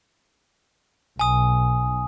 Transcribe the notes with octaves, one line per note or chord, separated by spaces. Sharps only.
B1 G#5 D#6